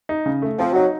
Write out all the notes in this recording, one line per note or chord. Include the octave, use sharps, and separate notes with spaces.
D#4
C#3
A3
F3 C4
F#3 D#4